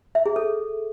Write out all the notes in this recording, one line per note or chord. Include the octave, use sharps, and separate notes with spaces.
E5
G#4
A4